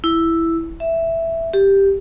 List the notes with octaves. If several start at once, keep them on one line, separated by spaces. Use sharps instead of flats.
E4
E5
G4